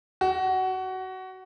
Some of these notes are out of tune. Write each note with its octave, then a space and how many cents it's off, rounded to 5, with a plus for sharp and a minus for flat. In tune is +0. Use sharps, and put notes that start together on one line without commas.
F#4 +20